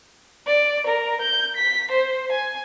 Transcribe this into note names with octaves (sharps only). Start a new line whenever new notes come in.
D5
A#4
G6
B6
C5
G#5